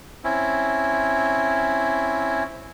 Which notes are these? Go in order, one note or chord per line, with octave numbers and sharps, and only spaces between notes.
C4 C#4 E4